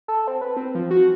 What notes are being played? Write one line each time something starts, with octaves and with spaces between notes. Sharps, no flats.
A4
C4
B4
C4
F3
F#4